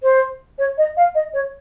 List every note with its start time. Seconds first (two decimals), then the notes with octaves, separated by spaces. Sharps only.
0.03 C5
0.58 C#5
0.77 D#5
0.97 F5
1.14 D#5
1.33 C#5